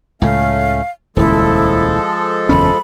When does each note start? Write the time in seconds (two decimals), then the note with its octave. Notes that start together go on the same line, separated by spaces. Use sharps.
0.22 C#2 A2 A3 C#4 F5
1.17 D#1 C#2 F3 G#3 E4 A4
2.49 F#1 E2 C#4 B5